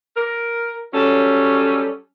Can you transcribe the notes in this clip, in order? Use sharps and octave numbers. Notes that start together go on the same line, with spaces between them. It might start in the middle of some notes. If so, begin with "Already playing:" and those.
A#4
F#3 G3 C#4 A4